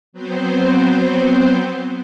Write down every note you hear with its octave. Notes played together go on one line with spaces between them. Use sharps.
F#3 B3 C4 C5